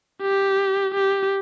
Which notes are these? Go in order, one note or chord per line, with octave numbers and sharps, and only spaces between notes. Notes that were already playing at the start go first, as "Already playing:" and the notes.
G4
G4